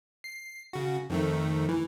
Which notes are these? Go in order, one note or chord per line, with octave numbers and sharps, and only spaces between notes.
C7
C#3 F#4
F2 D#3 A3
E3